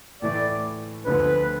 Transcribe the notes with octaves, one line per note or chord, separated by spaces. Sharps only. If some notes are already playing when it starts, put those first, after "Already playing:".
A2 E3 A3 D5
D2 D3 F3 B3 D4 B4